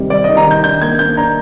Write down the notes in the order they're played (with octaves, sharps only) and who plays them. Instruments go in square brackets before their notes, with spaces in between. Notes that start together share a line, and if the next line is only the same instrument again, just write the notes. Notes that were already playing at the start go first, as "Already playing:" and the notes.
Already playing: [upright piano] C3 D#3 G3
[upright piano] G3 [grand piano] D5
[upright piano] D#3 [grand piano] D#5
[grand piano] A#5
[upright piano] D#3 [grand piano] G6
[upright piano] D4 [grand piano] G6
[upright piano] A#3 [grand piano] G#6
[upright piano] A#3 [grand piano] G6
[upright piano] D4 [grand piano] A#5